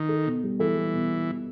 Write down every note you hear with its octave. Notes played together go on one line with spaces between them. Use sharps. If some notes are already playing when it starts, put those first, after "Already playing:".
Already playing: D#3
A4
B2
G3
E3 A4
G3
B2